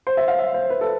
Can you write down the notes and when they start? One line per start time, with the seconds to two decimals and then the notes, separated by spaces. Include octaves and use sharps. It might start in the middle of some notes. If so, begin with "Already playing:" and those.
0.07 C5
0.17 E5
0.28 F5
0.39 E5
0.54 C5
0.70 B4
0.81 A4